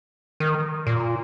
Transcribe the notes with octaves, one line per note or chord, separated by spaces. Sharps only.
D#3
A#2